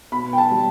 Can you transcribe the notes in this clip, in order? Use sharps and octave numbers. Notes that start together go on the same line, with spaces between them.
B2 B5
G5
A5
G3